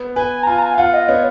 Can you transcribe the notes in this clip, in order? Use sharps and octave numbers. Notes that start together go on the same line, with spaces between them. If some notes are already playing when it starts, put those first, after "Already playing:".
Already playing: B3
B4 G#5
A#5
F4 G#5
A#5
G#5
F5
F4 F#5
D#5
B3 C#5